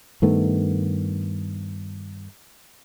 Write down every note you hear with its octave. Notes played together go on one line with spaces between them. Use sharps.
G2 D#3 A3 B3